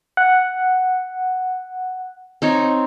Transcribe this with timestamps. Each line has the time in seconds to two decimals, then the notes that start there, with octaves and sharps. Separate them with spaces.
0.17 F#5
2.42 C4 D#4 C#5